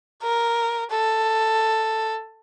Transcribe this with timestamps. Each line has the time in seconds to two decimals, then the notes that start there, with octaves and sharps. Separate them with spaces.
0.23 A#4
0.90 A4